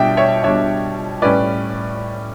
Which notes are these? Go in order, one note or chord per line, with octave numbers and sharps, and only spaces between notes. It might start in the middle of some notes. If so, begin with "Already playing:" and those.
Already playing: B2 G3 D4 E5 G5
C#5 E5
B2 G3 D4 C#5 E5
A2 G3 C#4 B4 D5